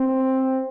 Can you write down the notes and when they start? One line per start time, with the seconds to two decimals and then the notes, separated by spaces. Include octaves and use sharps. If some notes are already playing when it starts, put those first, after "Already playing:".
Already playing: C4